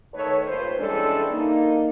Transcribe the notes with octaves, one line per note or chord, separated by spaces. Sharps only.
D#3 A3 A4 B4 C#5
G2 A#2 B4 C5
E3 G3 G#3 C#4 D4 A4
A#3 D#4